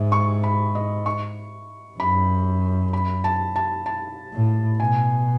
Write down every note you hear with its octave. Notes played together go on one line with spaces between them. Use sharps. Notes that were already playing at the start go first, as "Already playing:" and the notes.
Already playing: G#2 E5
C#6
B5
D#5
C#6
F#2 B5
B5
A5
A5
A5
A2
B2 G#5